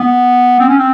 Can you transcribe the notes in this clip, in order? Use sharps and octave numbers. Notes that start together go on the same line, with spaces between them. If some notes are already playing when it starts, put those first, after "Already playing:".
Already playing: B3
C4
C#4
C4